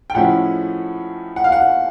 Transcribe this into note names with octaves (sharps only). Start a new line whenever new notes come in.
G5
A2 F3 G#3 C#4 E4 F#5
F#5
F5
F#5